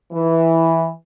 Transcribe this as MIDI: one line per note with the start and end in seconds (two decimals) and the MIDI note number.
0.12 0.91 52